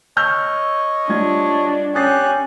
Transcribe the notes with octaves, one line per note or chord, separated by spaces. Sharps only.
C#5 D#5 E6 F6 G6
G3 D4 F4 G#6
C#4 G4 D#6 F#6 A6 C7